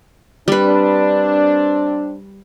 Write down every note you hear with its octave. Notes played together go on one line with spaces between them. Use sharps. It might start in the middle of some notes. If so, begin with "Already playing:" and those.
G3 C4 D4 B4